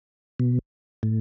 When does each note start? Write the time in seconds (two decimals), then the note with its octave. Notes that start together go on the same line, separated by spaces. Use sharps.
0.39 B2
1.03 A2